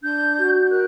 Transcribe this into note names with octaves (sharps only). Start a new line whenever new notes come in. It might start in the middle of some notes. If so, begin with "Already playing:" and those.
D4 G6
F#4
A#4 F#6